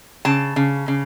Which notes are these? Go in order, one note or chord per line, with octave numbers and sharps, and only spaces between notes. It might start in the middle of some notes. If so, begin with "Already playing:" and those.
C#3 A5
C#3
C#3